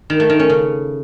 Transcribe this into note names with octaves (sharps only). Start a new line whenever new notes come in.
D#3
A3
D#3
C#4
C#3